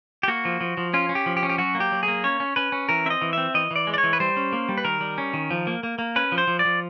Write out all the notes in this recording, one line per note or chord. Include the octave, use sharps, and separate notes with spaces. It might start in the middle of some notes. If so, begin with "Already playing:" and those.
G4
A#3 F#4
F3
F3
F3
C#4 F4
C#4
G4
F3
G4
C#4
G4
F#3 F#4
A#3
G4
F#3
G#4
A#3
C#4 C#5
C#4
C#4 B4
C#4
E3 A#4
C4 D#5 E5
E3
C4 E5
E3 D#5
E3 D5
G#3
D5
C#5
E3
B4
G3 C5
C#4
A#3
G3
B4
D#3 A#4
G3
C#4
D#3
F3
A#3
A#3
A#3
C#4 B4
F3
C5
F3
D5
F3